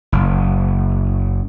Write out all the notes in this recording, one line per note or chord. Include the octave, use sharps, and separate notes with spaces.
F#1